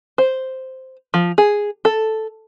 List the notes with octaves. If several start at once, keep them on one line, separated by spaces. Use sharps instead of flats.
C5
F3
G#4
A4